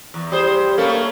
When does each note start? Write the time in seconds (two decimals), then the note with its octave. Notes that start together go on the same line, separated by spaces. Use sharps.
0.14 E2
0.32 G3 G#4 C5
0.78 A3 A#3 C#4 A4